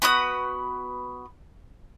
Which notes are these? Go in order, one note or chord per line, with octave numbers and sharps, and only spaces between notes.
B3 F#4 B5 D#6